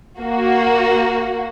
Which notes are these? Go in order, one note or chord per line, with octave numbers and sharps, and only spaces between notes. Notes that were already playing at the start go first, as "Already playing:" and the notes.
A#3 F#4